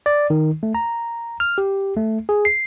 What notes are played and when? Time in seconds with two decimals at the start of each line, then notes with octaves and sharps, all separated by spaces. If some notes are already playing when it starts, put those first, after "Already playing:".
0.06 D5
0.30 D#3
0.63 A3
0.75 A#5
1.40 F6
1.58 G4
1.97 A3
2.29 G#4
2.45 C7